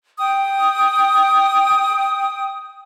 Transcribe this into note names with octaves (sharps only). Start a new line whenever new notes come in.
G5 D#6